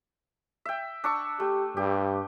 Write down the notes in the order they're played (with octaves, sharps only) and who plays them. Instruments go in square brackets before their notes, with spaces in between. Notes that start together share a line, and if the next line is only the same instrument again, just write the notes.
[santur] E5 G5
D4 C#6 E6
[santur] A3 [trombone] G4
[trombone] G2 [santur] G4